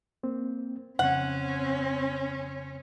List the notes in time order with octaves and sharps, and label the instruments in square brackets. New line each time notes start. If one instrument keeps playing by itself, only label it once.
[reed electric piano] A#3 C4
[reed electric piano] F2 C#3 [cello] C4 C#4 [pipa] F#5